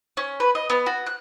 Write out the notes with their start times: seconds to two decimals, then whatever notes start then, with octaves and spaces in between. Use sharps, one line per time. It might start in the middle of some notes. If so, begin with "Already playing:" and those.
0.17 C#4
0.40 B4
0.55 D#5
0.70 B3
0.86 F#4
1.06 F#6